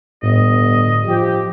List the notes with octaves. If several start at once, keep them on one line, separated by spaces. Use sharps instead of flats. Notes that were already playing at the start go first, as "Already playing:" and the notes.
G1 A2 D#5
F3 G4